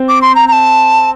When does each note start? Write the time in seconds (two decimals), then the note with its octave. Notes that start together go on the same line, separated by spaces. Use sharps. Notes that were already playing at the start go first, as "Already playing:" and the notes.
Already playing: C4
0.08 D6
0.22 C6
0.35 A#5
0.48 A#5
0.52 A5